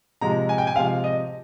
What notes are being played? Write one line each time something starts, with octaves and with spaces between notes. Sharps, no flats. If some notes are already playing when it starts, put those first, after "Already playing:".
C3 F3 G#3 A#5
G#5
G5
G#5
C3 F3 G#3 F5
D#5